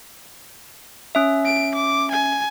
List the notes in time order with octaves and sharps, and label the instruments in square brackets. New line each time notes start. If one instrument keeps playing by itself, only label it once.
[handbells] C#4 E5
[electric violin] D7
D6
G#5